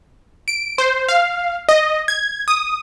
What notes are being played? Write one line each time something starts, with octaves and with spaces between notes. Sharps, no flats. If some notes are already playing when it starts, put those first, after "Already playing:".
D7
C5
F5
D#5
G#6
D#6